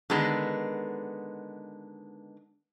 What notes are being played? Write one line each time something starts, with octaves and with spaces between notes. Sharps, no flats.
D3 D#3 G#3 B3